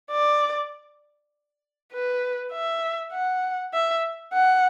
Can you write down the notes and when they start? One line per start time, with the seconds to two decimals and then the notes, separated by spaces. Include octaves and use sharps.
0.11 D5
1.92 B4
2.52 E5
3.13 F#5
3.74 E5
4.33 F#5